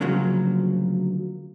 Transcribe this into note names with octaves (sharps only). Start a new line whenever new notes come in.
D2 C#3 F3 F#3 A#3